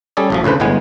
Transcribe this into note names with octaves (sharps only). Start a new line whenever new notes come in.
G3 C#4 G#4 A4 D5
A1 F#2 F3
D2 A2 C#3 B4 C5
G1 A2 G#3 B3 G#5